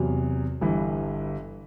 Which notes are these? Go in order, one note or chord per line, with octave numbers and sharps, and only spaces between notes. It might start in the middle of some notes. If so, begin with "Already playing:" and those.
Already playing: E2 C3 F#3
G1 G2 E3